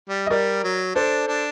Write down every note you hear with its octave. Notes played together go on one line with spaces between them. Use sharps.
G3
D#5
G3 A#4 D5
F#3
D4 A4 C5
D4